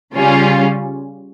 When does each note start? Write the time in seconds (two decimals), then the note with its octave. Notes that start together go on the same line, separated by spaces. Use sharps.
0.13 C#3 G3 C#4 F4